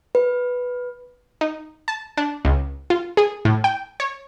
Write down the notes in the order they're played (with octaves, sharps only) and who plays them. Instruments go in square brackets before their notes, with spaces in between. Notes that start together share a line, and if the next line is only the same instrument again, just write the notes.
[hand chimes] B4
[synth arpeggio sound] D#4
A5
D4
C#2
F4
G#4
A2
G5
C#5